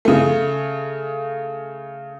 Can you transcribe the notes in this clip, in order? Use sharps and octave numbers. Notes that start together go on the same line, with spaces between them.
C#3 A3